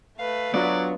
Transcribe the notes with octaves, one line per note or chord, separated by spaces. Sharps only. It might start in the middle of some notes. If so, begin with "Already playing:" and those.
A3 B4 F5
F#3 B3 D4 F4 D5